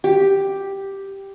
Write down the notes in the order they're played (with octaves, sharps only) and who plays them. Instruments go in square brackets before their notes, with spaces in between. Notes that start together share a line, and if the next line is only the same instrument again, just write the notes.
[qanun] G4